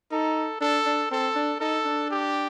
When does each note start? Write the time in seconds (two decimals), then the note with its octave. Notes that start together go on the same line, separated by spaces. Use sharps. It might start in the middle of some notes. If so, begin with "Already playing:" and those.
0.11 D#4 A4
0.61 D4 A4
0.86 D4
1.11 C4 A4
1.35 D4
1.60 D#4 A4
1.85 D4
2.11 G4